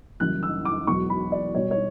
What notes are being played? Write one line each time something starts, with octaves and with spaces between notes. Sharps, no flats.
F#1 F#2 E3 G3 F#6
E6
D6
E1 E2 B2 F#3 C#6
B5
D5
B1 B2 G3 C#5
C#5